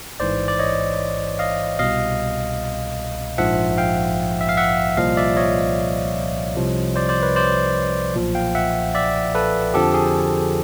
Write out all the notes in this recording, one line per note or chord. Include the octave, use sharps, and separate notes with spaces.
A1 G#2 E3 C5 D5
D5
C#5 D#5
D#5 F5
C2 B2 D#5 F5
A#1 G#2 F3 E5 F#5
F5 G5
E5
F5
E5 F#5
C2 A#2 F3 D#5 F5
D5 E5
C#5 D#5
C2 C3 F3
C5 D5
C5 D5
B4 C#5
C5 D5
B1 A#2 F3
F5 G5
E5 F#5
D5 E5
A4 B4
F2 D3 F3 G4 A4
G#4